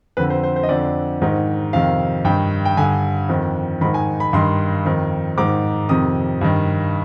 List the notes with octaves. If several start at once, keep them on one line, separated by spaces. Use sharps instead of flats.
F2 D3 B4
C5
C5
C5
D#5
F2 D3 D5
G#2 D#3
F2 C3 D#3 F5
G2 D#3 G5
G5
G2 D3 G#5
F2 D#3
G#2 D#3 B5
G#5
B5
G2 D#3 C6
F2 D#3
G#2 D#3 D6
F2 C3 D#3 D#6
G2 D#3